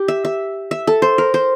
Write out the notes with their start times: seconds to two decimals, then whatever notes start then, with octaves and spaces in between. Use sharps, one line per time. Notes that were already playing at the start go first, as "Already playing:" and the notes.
Already playing: G4
0.08 E5
0.25 E5
0.71 E5
0.87 A4
1.02 C5
1.18 A#4
1.34 C5